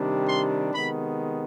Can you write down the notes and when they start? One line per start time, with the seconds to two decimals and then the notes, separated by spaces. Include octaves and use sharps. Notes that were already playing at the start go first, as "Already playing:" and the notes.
Already playing: C3 D#3 G3 D4
0.27 C6
0.73 C3 D#3 G#3 B3 B5